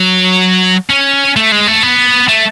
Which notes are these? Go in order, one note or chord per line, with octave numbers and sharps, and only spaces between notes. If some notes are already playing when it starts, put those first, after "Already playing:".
Already playing: F#3
C#4
A3
G#3
A3
B3
A3